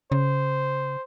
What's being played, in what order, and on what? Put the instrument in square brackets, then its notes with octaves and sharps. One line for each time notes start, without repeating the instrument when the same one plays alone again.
[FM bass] C#3 [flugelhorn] C5